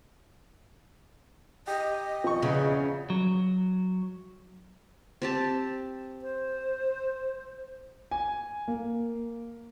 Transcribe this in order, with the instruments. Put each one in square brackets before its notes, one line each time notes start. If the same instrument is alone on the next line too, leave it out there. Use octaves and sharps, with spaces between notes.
[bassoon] G4 [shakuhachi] D#5
[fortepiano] F3 C#6
[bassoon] E2 [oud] C#3
[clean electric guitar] F#3
[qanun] C4 G4 A5
[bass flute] C5
[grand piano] G#5
A#3